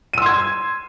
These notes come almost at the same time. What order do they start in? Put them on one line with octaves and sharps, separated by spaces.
D#7 E6 C6 G#6